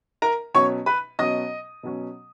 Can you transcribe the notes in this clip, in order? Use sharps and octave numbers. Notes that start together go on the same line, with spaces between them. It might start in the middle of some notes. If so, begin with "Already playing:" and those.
A#4 A#5
B2 F#3 C#4 C#5 C#6
B4 B5
B2 F#3 C#4 D#5 D#6
B2 F#3 C#4